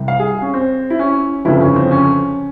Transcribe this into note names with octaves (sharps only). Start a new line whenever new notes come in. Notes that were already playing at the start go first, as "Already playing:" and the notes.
Already playing: C2 C3 G3
F5
G#4
C#4
C4
E4
C#4
G1 F2 C#3 F3 E4
C#4
C4
C#4